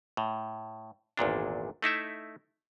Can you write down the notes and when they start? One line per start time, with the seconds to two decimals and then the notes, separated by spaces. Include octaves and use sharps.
0.17 A2
1.17 G#1 E2 A#2 D4
1.82 A3 D#4 E4 E5